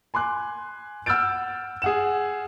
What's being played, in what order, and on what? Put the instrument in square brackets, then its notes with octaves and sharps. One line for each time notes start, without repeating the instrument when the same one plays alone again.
[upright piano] G#5 C6 D6 F#6
F#5 E6 F6 G6 A6 D7
G#4 F#5 E7